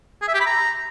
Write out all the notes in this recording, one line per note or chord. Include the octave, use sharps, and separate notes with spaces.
G#4
E5
G4
B5
A#5